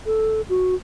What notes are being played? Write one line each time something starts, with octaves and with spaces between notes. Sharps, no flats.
A4
F#4